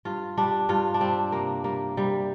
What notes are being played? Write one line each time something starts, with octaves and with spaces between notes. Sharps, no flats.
G2 F4
G3 D4
G2 F4
D4
G3 C4
C3 A#3
G3 A#3
C3 G3